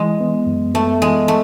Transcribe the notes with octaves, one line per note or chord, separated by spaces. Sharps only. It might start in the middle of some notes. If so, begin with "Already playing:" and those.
Already playing: E3 G#3
B3
F#2
A3 B3
E3 G#3
A3